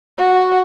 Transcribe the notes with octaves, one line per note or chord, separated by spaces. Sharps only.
F#4